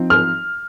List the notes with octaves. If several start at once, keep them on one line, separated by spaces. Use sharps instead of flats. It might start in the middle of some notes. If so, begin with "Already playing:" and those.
Already playing: F3 C4 D#4
F6